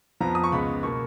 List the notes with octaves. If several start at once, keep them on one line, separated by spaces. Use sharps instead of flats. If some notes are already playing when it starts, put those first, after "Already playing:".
F2 F3 B3 A#5
D#6
C#6
C#2 C#3 G#3 B3 B5
B2 A#3 C#6